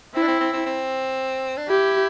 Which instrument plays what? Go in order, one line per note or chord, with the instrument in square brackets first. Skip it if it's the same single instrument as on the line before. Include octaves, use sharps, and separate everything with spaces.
[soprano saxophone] C4 [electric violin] E4
[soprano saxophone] D4
C4
C4
C4
C4
D4
[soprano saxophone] E4 [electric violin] G4